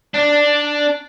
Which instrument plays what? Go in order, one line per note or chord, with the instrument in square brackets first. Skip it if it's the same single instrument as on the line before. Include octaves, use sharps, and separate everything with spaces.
[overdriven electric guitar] D4